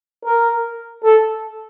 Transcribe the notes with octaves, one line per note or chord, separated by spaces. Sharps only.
A#4
A4